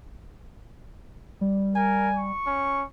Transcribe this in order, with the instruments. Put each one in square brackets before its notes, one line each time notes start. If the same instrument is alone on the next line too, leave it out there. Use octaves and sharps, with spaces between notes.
[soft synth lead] G3
[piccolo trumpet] A#4 [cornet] G#5
[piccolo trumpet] C#6
[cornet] C#4